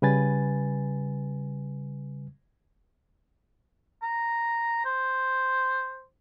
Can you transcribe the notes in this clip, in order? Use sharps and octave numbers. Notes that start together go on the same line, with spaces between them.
C#3 G3 B4 G#5 A6
A#5
C5